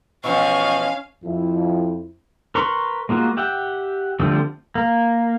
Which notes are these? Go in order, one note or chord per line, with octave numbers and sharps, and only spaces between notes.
B2 E3 F3 C#4 F5 C#6
F2 E4
A#4 B4 C6 C#6
G#3 A#3 F4 F#4
G4 E5 F#5 G5
D3 F3 G3 A3 C4
A#3